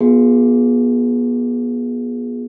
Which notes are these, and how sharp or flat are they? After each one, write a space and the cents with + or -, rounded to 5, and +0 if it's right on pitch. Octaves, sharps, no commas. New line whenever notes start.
B3 -30 F4 +45 G#4 +5